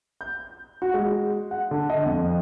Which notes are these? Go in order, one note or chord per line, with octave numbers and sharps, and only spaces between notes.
G6
F#4
G#3
F#5
D3
D#5
F2